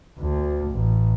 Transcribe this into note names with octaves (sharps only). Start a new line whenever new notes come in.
D2
A1